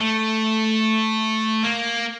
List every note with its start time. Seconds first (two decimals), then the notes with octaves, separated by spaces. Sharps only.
0.01 A3
1.64 A#3